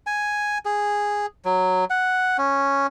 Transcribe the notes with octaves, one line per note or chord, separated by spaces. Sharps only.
G#5
G#4
F#3
F#5
C#4